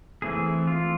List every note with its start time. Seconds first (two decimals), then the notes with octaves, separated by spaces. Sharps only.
0.22 E3 A3 C4 G#4
0.67 F4